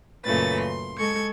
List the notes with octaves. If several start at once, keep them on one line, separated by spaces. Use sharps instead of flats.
F#2 A#2 C#3 A3 B4 A6
C6
G#3 A4 C#6 G#6